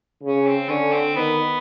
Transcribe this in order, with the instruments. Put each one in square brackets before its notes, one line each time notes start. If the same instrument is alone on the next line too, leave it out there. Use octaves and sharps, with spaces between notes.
[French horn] C#3 [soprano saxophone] C#4
[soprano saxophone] C4
[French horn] D3 [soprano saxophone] C#4
[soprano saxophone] C4
[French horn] D#3 [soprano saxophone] B3